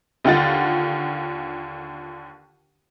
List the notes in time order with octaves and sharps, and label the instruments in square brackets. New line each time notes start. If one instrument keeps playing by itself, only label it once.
[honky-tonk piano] D#2 D3 F4 F#5 A6